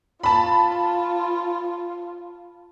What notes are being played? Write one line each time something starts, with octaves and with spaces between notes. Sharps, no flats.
F4 A5 B5